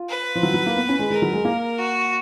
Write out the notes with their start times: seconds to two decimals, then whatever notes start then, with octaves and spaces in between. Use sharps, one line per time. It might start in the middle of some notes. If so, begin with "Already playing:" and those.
Already playing: F4
0.10 B4
0.35 F3
0.43 F#3
0.54 F#3
0.66 A#3
0.76 B3
0.89 C#4
0.99 G#3
1.10 G#3 A#4
1.22 F#3
1.33 G#3
1.45 A#3
1.78 F#4